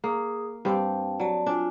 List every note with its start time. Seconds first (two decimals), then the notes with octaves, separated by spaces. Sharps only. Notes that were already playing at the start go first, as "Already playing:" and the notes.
0.04 A#3 G#4 D#6
0.65 G2 C4 G4 F5 G5 A5
1.20 F#3 D5 A5
1.47 D4 F4 G#5